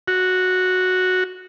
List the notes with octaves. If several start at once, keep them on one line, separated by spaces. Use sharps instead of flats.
F#4